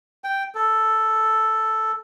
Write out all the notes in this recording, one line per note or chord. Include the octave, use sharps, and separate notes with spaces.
G5
A4